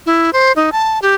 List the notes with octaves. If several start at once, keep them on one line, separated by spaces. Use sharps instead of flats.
E4
C5
D#4
A5
G4